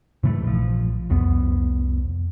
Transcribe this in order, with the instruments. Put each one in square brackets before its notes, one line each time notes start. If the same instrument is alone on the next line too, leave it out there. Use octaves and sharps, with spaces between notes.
[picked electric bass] G#2 C3 E3 A3
A#1 F3
C2 F2 B3